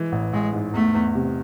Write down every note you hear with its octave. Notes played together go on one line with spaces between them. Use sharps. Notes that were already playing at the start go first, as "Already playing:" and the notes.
Already playing: E3 G#3
A1
A1 G#3
G#2
E2 A3
E2
C3